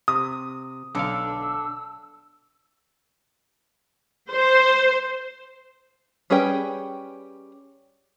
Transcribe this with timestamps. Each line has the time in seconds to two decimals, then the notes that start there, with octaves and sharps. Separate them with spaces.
0.08 C3 D#6
0.95 B1 D3 D4 F5 E6
4.31 C5
6.30 G3 C#4 G#4 B4 G5